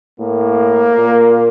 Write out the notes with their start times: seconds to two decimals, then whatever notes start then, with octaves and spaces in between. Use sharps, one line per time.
0.20 A2 A#3
0.95 A#2